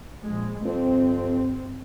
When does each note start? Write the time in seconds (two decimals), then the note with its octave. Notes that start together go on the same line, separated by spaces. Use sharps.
0.23 A#1 G#3
0.65 G1 F2 C4